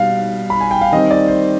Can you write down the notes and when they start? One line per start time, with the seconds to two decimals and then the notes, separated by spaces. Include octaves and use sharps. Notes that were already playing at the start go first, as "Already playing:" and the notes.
Already playing: B2 G3 F5
0.50 B5
0.61 G#5
0.71 G5
0.81 F5
0.92 D#3 G3 C4 D#5
1.11 D5
1.28 C5